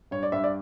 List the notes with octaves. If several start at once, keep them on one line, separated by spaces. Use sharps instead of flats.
G2 C#5
D5
G2 E5
D5